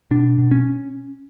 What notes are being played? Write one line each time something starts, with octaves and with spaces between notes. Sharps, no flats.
B2 D4
B2
C#4